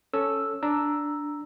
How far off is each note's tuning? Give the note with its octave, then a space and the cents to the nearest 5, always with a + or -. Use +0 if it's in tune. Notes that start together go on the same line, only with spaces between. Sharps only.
C#4 +0 A4 +0 E6 +0
D4 +0 A#5 +0 E6 +0